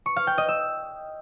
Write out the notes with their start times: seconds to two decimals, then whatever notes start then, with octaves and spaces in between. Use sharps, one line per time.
0.06 C#6
0.16 F5
0.27 G5
0.38 D#5
0.48 E6